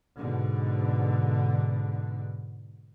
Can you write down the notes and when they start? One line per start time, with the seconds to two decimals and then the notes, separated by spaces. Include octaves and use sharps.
0.17 G#2 B2 D3